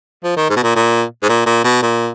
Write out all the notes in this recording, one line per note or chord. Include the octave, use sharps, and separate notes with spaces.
F3
D#3
G#2
B2
A#2
A#2
G#2
A#2
A#2
B2
A#2